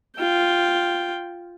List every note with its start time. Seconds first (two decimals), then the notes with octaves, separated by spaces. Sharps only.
0.18 F4 G5